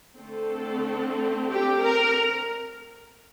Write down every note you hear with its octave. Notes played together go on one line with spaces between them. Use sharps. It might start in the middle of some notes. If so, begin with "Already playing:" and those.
D3 A3 C4 A4
G4
A#4